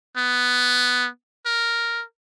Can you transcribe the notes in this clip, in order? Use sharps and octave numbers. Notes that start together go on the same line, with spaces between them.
B3
A#4